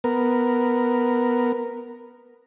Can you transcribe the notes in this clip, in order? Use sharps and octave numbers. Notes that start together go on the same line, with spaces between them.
B3 A#4